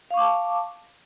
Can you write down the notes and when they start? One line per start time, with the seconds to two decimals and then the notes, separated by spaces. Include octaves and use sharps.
0.11 F5
0.14 C#6
0.17 D6
0.20 A5